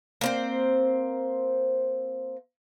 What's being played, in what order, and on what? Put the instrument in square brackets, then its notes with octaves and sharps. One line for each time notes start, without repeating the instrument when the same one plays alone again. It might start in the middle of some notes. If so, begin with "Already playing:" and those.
[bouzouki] A#3 C4 C5